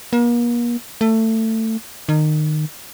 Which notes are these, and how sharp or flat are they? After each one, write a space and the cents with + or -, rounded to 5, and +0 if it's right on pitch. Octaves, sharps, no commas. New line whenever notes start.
A#3 +40
A3 +20
D#3 -25